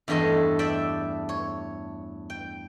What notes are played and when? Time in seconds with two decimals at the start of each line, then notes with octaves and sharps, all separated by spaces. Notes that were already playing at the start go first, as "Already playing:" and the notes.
0.08 E2 G2 A3 A4 D#5
0.59 D5 E5 G5 A5
1.29 C#5
2.30 G5